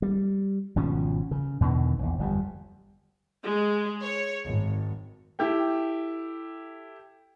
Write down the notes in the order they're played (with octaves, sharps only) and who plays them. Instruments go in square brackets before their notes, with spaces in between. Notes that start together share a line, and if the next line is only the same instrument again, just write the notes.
[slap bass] G3
G#1 B2 F3 C#4
C#3
E2 B2 D3 D#3
A#1 E2
G1 F2 A#2 G3
[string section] G#3
C#5
G#1
[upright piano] E4 G4 A4 G5